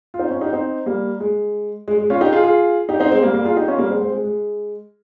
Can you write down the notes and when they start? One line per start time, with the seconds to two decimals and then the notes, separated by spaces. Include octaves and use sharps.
0.14 F4
0.19 C4 D#4
0.30 C#4 F4
0.41 D#4 G4
0.53 C4 D#4
0.86 G3 A#3
1.20 G#3
1.88 G#3
1.99 G#3
2.10 C#4 F4
2.21 D#4 G4
2.32 F4 G#4
2.43 F4 G#4
2.89 D#4 G4
3.00 C4 D#4
3.12 G#3 C4
3.22 G3 A#3
3.33 G3 A#3
3.44 F4 G#4
3.56 D#4 G4
3.68 C#4 F4
3.78 G3 A#3
3.90 G#3 C4
4.01 G#3 C4
4.12 G#3
4.24 G#3